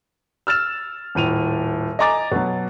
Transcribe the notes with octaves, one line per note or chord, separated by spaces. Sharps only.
E6 F6 A6 E7
D#1 A2 D#7 F7
D#5 G#5 A#5 D6 A6
B2 F#3